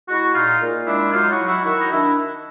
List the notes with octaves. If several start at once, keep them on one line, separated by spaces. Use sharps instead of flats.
G#3 E4 F#4
A#2 D#4 F4
A#2
G#3 D4 E4
F#3 D#4 F4
E4 F#4
F#3
E4 F#4
D#3 E4 F#4
D#4
D#3 D4 E4